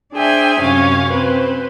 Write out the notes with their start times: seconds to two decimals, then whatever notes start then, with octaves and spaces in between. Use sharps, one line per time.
0.14 D4 G#4 C5 E5 G5 G#5
0.62 F#2 C3 C#4 C#5 F5
1.13 C4 B4 C5